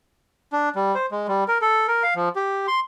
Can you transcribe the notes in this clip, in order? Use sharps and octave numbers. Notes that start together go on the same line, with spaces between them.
D4
G3
C5
G#3
G3
A#4
A4
A#4
F5
F3
G4
C6